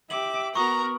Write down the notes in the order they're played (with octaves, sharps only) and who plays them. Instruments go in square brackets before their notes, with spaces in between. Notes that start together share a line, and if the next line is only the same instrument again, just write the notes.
[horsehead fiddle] G4 E5 [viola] D6 [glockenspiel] F#7
[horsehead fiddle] B3 [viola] F#4 A#4 [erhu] A#5 [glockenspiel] C#6 D#6